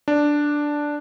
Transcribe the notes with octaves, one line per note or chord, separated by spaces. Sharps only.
D4